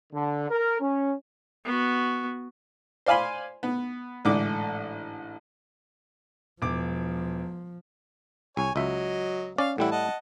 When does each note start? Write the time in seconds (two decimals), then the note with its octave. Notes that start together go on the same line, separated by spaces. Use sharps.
0.13 D3
0.50 A#4
0.80 C#4
1.65 B3 F#4
3.06 C5 D5 F5 G#5 B5 C6
3.63 B3
4.25 A1 G#2 D3 D6
6.62 E1 F3 D6
8.57 C2 C#5 G#5
8.76 C#2 F#3 D#5 E5
9.58 C#4 D5 F5
9.78 A2 E3 G3 E4 G4 F#5
9.92 D#5 F#5 A5